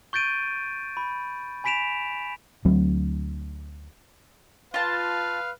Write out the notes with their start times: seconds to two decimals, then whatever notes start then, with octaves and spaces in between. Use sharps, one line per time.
0.13 C#6 G6 A6 D7 D#7
0.97 B5
1.64 G#5 B5 B6 D7 E7 F7
2.65 D2 F#3 C4
4.74 F4 B4 F5 A5